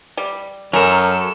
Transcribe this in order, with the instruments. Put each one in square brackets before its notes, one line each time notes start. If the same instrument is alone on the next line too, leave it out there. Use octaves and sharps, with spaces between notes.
[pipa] G3
[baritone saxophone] F#2 [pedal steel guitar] F#3 A4 [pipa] A#4 [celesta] G#5 C#6